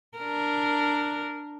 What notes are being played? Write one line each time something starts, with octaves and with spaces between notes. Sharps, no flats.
D4 A#4